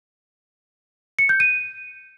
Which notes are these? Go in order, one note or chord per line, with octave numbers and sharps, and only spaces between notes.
C#7
G6
D#7